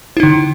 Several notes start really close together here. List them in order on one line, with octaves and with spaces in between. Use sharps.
E4 D#4 D3